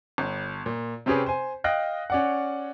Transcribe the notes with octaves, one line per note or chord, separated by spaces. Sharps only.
G1
A#2
C3 C4 C#4 G4 G#4 B4
C5 G#5
D#5 F5 G5 F#6 A#6
C#4 D5 F#5